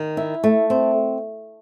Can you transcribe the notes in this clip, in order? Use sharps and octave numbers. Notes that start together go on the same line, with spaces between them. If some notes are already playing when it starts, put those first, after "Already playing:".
Already playing: D#3
E4
A3
C4